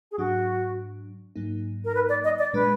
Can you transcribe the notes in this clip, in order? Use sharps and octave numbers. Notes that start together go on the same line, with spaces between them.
G#4
G#2 F#3 D4 F#4
G#2 F#3 A#3 D#4
A#4
B4
D5
D#5
D5
A#2 G#3 D4 B4